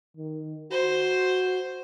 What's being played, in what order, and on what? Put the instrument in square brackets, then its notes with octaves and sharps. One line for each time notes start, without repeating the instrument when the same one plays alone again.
[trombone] D#3
[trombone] F#4 [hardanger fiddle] C5